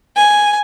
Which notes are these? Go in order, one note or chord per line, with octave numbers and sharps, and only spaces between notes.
G#5